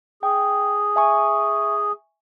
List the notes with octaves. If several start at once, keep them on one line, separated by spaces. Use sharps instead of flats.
G#4 G5
E5 G#5 C#6